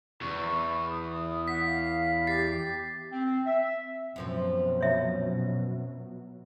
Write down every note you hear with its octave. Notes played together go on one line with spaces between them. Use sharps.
E2 C#6
D#6
F#5 B6
F5
G4 A6 C7
C4
E5
F#2 B2 F3 F#3 C4
C#5 E5